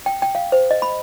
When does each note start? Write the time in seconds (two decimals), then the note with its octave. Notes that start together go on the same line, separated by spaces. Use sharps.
0.06 G5
0.22 G5
0.35 F5
0.52 C5
0.71 D#5
0.82 B5